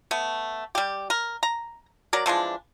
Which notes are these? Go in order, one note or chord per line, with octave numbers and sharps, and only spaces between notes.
A3 B3
G3 G4
A#4
A#5
F#3 A#4 D5
E3 F3 G#3 D4